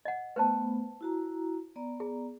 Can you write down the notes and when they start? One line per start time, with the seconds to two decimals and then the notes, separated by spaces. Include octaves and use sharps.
0.05 D#5 F#5
0.36 A3 B3 B4 C5 A5
1.01 E4 F#4 A#5
1.76 B3 D5 A#5
2.00 G#4